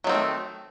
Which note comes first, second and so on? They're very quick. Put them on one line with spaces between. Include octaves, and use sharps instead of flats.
F#3 D#3 C4 G3 A3